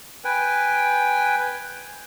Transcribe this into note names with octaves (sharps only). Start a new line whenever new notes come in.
B4 G5 G#5